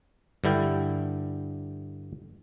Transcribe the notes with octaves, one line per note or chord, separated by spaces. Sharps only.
G2 D3 E4 G5